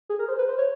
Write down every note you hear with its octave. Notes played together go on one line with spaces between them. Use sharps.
G#4
A#4
C5
B4
C5
C#5